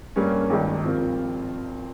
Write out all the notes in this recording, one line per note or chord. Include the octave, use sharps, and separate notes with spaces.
G2 G3 A#3 C#4
G#1 G2 D#3 G3
F3 C4 F4 A#4